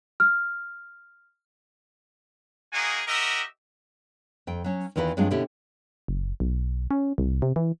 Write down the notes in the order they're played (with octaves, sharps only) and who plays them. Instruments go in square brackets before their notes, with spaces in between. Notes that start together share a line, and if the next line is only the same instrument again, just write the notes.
[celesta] F6
[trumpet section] A#3 D#4 F#4 G#4 G#5
F#4 G4 A#4 D#5 E5
[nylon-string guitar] F2 G5
F#3 C#4
E2 D#3 E3 F4 A#4 B4
G2 F#3 G#3 C4 D4 F4
B2 D3 C#4 E4 G4
[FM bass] F#1
B1
C#4
C2
C3
E3